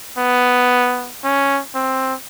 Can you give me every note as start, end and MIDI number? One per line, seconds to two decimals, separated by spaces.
0.18 1.12 59
1.24 1.61 61
1.75 2.14 60